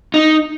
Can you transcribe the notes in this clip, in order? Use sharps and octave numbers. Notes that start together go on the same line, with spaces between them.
D#4